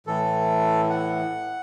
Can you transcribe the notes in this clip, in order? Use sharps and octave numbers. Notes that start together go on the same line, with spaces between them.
A2 E3 A4
F#5